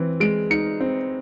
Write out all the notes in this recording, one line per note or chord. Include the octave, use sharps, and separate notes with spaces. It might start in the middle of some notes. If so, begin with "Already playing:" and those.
Already playing: E3 C4
G#3 D7
D#4 C#7
C4